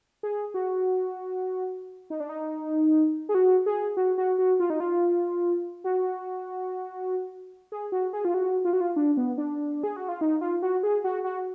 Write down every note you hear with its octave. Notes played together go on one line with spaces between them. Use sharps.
G#4
F#4
D#4
D4
D#4
G#4
F#4
G#4
F#4
F#4
F#4
F4
D#4
F4
F#4
G#4
F#4
G#4
F4
F#4
F4
F#4
F4
D4
B3
D4
G#4
F#4
F4
D#4
F4
F#4
G#4
F#4
F#4